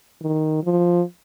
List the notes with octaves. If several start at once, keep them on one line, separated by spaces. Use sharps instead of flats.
D#3
F3